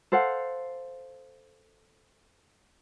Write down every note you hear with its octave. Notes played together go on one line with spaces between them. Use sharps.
A4 C5 F5 F#5